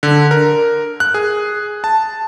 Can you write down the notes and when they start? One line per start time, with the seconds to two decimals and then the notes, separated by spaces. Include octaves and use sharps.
0.03 D3
0.31 A#4
1.00 F#6
1.14 G#4
1.84 A5